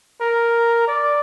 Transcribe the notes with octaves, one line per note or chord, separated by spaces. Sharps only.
A#4
D5